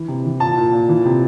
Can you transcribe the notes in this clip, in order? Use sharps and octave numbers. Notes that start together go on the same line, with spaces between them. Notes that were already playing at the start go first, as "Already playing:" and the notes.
Already playing: E3
C3
E3
A#2 A5
A#2
A#2
E3
C3